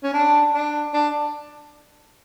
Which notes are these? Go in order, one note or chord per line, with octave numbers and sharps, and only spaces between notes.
C#4
D4
D4
D4